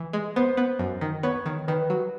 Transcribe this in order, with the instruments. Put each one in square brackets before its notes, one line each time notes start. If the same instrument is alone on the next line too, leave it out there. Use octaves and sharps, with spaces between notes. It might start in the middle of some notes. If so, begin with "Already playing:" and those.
Already playing: [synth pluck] E3
G#3
[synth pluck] B3 [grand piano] C5
[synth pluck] B3
F#2
D#3
[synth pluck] B3 [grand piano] C#5
[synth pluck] D#3
[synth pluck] D#3 [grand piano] B4
[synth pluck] F#3